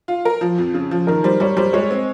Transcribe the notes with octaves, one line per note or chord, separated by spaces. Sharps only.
F4
A#4
F3
F2
C#3
F3
D#3 A#4
G3 C5
G3 C#5
G3 C5
G#3 C#5
C4